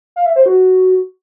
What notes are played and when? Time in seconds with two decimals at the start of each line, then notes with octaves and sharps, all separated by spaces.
0.16 F5
0.26 E5
0.36 C5
0.46 F#4